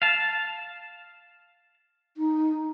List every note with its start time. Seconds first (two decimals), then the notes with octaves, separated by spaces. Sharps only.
0.02 F5 A5
2.17 D#4